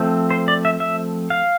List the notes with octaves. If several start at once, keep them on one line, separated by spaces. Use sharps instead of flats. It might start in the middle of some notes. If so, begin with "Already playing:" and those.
Already playing: F3 A3 C4
C5
D5
E5
E5
F5